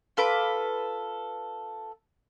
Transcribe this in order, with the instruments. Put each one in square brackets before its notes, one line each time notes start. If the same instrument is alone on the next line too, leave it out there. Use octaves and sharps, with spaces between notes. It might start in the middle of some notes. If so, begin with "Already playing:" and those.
[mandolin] F4 A4 B4 D6